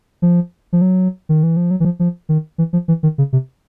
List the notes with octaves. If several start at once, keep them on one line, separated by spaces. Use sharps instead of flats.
F3
F3
F#3
D#3
E3
F3
F#3
E3
F3
F3
D#3
E3
F3
E3
D#3
C#3
C3